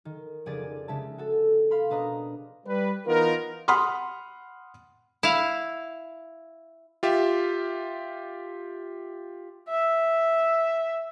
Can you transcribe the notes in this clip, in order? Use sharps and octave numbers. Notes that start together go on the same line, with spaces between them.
D#3
F1 C#3 G#4 D5 A6 D#7
C#3 G#3 E5 A5
F#4 A4
F5 B5 C6
B2 D4 B4 D#5 A#5 D#6
G3 B4
E3 B3 D#4 F4 A#4
F#5 B5 C6 D#6 F6
E4 F5
F4 G4 E5
E5